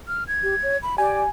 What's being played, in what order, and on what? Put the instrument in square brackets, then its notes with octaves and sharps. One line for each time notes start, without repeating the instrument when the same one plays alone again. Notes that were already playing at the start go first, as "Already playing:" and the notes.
[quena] F6
G#6
[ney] G4
C#5
B5
[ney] G4 [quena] D5 [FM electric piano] G#5